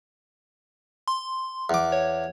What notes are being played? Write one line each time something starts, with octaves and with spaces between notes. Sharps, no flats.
C6
E2 D6
C#5